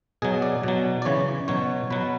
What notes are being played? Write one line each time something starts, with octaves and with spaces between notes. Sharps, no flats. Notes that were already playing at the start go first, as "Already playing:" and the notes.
B2 F#3 G#4
D5
B2 F#3
D5
C#3 E3 C#5
B2 F#3 C#5
B2 F#3 B4